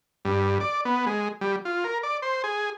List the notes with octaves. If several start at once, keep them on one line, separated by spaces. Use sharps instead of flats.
G2
D5
B3
G#3
G3
F4
A#4
D5
C5
G#4